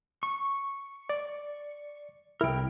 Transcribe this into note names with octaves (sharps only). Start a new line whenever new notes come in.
C#6
D5
C2 E4 A#4 G5